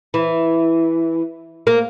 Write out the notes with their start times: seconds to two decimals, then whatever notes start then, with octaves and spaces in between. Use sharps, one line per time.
0.14 E3
1.67 A#3